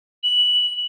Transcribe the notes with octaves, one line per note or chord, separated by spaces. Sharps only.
F#7